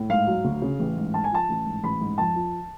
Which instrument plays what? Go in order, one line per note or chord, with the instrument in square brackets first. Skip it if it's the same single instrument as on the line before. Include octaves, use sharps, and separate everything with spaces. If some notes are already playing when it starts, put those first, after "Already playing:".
Already playing: [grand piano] A2
G#2 F5
F#3
D2
C#3
A1
G#2
G#2 A5
G#5
F3 A5
A1
G#2
A1 B5
G#2
F2 A5
F3